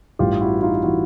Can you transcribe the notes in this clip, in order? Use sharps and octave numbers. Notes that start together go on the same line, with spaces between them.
A1 G2 E3 F4 G4
E4 F#4
D#4 F4
E3 E4 F#4